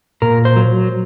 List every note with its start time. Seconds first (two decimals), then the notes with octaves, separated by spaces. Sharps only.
0.22 A#2 A#4
0.45 C5
0.56 F#3